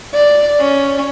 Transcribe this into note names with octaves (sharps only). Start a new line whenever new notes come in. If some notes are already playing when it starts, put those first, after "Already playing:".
D5
C#4